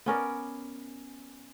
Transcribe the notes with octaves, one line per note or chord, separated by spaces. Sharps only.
B3 C#4 A#4 D5